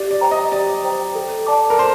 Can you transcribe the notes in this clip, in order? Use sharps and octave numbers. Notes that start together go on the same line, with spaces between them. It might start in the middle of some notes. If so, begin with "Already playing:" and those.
Already playing: G4 D5
D5
C5 G5 A#5
D#5
G4 D5
C5 G5 A#5
A4
D5 A5 D6
A#4
A4 C5